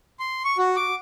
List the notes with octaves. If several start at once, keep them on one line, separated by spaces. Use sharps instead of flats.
C6
C#6
F#4
D6